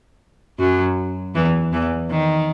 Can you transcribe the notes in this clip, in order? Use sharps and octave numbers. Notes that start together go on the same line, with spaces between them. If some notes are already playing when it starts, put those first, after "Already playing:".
F#2 F#3
E2 E3
E2 E3
D#3